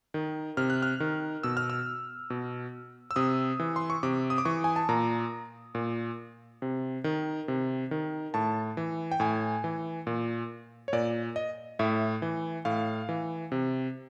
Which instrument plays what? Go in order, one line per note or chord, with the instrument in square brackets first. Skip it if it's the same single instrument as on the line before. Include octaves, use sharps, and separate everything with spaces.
[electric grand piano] D#3
C3 F6
F#6
F6
D#3
B2 E6
F6
E6
B2
E6
C3 D#6
E3
C6
C#6
C3 D6
D#6
D6
E3 C#6
G#5
A5
A#2 A#5
A#2
C3
D#3
C3
D#3
A2 A5
E3
G5
A2 G#5
E3
A#2
C#5
A#2 D5
D#5
A2 E5
E3
A2 F5
E3
C3